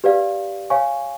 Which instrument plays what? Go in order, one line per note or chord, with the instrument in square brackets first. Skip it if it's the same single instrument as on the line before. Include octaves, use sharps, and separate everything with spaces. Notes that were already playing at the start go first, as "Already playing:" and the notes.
[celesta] G4 B4 D5 F5
C#5 F5 G#5 C#6